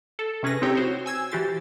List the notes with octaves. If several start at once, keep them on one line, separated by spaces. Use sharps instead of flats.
A4
C3 C#4 G#4 B4 A#6
C4 D#4 E4 G4 C#5 G5
F#4 C5 C#5
G#5 E6 G#6
E3 F#4 G4 C5 A6